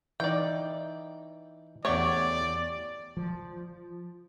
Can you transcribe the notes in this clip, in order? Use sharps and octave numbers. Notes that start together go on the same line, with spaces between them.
E3 D#4 D5 G5
E2 F#3 A3 G4 C#5 D5
F3